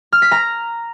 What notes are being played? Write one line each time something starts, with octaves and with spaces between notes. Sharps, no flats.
F6
B6
A#5